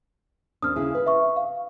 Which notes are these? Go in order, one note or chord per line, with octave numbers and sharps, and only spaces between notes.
D#2 C4 D4 D#6 F6
C#3 E4 G#4
B4
E5 C#6
F5